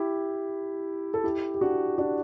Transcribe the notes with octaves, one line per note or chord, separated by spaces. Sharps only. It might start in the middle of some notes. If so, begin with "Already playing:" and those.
Already playing: E4 G4
A4
E4 G4
G4
D4 F#4
D4 F#4